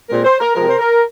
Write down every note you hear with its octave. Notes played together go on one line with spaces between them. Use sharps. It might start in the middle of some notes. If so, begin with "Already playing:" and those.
A#2 G#3 C4 A#4
C5
A#4
C3 F3 G#3 A#4
C5
A#4